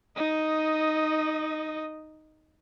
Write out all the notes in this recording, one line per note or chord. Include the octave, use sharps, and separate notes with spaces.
D#4 D#5